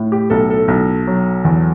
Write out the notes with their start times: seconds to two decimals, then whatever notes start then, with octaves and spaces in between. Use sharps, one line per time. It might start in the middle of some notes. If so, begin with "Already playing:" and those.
Already playing: A2
0.12 G4
0.30 B1 A4
0.50 A4
0.68 B1
1.07 F#3
1.45 E2